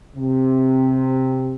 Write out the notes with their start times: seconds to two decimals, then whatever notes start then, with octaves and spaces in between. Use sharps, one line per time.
0.16 C3